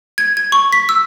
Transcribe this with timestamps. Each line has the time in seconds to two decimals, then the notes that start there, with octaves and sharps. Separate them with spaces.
0.18 G#6
0.37 G#6
0.52 C#6
0.73 B6
0.89 E6